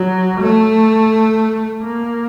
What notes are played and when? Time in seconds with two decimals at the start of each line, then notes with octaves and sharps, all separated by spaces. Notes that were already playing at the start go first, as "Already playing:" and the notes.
Already playing: F#3
0.40 A3
1.83 A#3